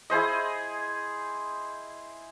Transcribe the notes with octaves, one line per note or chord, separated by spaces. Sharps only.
E4 G#4 C5 D#5